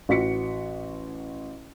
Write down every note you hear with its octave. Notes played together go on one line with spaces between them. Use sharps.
A1 F#4 B6 C#7